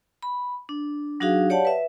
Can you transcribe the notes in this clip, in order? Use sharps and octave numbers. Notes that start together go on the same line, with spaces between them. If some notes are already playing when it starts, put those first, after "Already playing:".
B5
D4
F#3 D4 D#4 F#4 G#4 F5
G4 C#5 D5 F5 F#5 A5
B4 E5